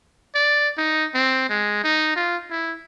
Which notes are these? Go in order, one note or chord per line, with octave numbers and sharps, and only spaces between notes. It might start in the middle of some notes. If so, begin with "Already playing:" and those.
D5
D#4
C4
G#3
D#4
F4
E4